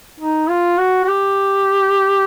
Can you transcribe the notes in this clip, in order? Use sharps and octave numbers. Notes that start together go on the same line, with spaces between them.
D#4
F4
F#4
F#4
G4